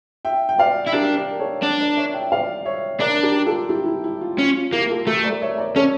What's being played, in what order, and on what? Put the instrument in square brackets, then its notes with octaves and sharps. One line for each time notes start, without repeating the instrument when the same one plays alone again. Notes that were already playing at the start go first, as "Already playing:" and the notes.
[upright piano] E5 G5
G5
D5 F5
[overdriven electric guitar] E4
[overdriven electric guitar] D4 [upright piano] G4 A#4
[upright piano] A#4 D5
A4 C#5
[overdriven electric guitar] D4
[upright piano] A#4 D5
C#5 E5
E5 G5
D5 F5
C#5 E5
[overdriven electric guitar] D4 [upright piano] A#4 D5
[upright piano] G4 A#4
F4 A4
E4 G4
E4
E4
F4
[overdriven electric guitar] C#4 [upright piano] F4
[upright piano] F4
[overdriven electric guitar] A#3 [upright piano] E4 G4
[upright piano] A#4
F4 A4
[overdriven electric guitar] A3 [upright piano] G4 A#4
[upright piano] A#4 D5
C#5 E5
A#4 D5
[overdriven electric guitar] C#4 [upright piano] A4 C#5